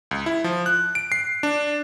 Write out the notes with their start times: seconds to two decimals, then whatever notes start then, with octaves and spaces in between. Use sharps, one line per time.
0.11 C#2
0.26 E4
0.44 F3
0.66 F#6
0.95 D7
1.12 C7
1.43 D4